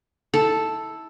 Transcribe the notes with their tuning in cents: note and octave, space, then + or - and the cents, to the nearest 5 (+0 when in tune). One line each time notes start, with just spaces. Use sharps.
E4 -25 A4 +0